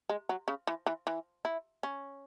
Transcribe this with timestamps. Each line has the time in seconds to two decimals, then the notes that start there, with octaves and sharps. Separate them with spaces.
0.09 G#3
0.29 F#3
0.48 C#3
0.67 E3
0.86 E3
1.07 E3
1.45 E4
1.83 C#4